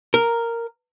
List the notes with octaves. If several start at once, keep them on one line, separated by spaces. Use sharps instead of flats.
A#4